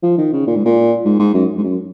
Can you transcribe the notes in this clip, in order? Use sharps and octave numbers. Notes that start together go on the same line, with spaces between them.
F3
D#3
C#3
A#2
G#2
A#2
G#2
G#2
F#2
G#2
F#2